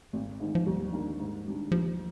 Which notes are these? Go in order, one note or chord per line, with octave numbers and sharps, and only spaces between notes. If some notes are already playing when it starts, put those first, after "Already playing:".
G#1
G#2 D#3
F3
D#2 G3
D#3 A#3 D4
G#2
D#3 G3 D4
D#2 F3